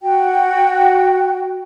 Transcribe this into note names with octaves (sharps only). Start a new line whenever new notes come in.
F#4 G5